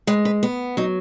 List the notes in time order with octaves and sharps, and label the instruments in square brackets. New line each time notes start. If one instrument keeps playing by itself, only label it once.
[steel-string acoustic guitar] G#3 B4
B4
B3
F#3 D#4